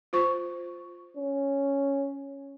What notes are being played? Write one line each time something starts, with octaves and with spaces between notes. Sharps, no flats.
F4 C5 C#6
C#4